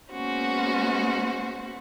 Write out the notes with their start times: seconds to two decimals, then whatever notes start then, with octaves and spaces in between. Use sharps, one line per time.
0.11 G#3 A#3 B3 C#4 F#4 C5